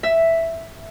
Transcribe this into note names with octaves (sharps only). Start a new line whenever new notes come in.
E5